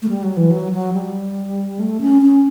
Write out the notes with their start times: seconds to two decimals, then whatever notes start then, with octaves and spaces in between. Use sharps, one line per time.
0.02 A3
0.09 G3
0.23 F#3
0.37 E3
0.51 F#3
0.72 F#3
0.93 G3
1.79 A3
2.01 C#4
2.22 C#4